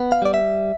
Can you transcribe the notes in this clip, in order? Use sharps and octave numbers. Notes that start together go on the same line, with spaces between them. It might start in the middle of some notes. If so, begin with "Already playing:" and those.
Already playing: B3
F5
G3 D5
E5